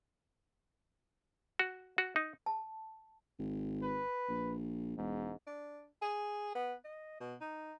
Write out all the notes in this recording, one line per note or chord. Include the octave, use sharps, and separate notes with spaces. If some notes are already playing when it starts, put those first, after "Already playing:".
F#4
F#4
D#4
A5
G#1
B4
A#1
E1 G#2
D4
G#4
B3
D#5
B2
D#4